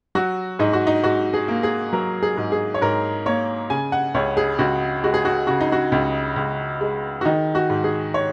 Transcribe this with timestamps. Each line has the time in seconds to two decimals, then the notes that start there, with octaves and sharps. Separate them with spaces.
0.15 F#3 F#4
0.59 G#2 D#4
0.73 F#4
0.87 D#4
1.04 G#2 F#4
1.34 G#4
1.48 A#3
1.63 G#4
1.93 F#3 A#4
2.23 G#4
2.37 G#2
2.52 G#4
2.74 C#5
2.81 G#2 A#4
3.26 A#3 C#5
3.70 C#3 G#5
3.92 F#5
4.14 C#2 C#5
4.37 G#4
4.59 C#2 F#4
5.04 G#3 F#4
5.14 G#4
5.25 F#4
5.47 C#3 F#4
5.60 D#4
5.72 F#4
5.92 C#2
6.36 C#2
6.81 G#3
7.21 F#4
7.25 D#3 D#4
7.55 F#4
7.70 G#2
7.84 G#4
8.14 C#5